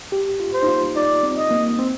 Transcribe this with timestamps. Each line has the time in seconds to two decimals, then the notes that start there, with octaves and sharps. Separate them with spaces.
0.12 G4
0.40 F4
0.53 C5
0.63 D#4
0.68 F4
0.95 D#4 D5
1.23 C4
1.37 D#5
1.51 A#3
1.79 C4